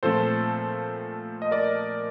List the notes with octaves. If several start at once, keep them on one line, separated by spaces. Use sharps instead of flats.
A#2 F3 A3 C4 A4 C5
D#5
A#4 D5